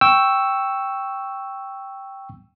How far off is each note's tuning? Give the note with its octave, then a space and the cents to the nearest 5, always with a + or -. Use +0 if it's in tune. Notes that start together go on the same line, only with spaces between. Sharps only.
G5 +0 C#6 +0 E6 +0